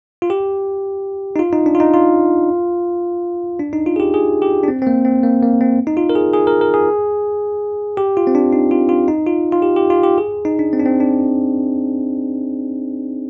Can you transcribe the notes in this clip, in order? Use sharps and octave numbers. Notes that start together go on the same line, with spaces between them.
F4
G4
D#4
F4
D#4
D4
F4
D#4
F4
D4
D#4
F4
G#4
G4
G#4
G4
D4
C4
C4
A#3
C4
A#3
A#3
C4
D#4
F4
A#4
G#4
G#4
A#4
A#4
G#4
G4
F4
C4
D4
D#4
F4
F4
D#4
F4
F4
G4
G4
F4
G4
G#4
D#4
D4
C4
D4
C4
D4